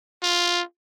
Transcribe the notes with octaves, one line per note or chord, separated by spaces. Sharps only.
F4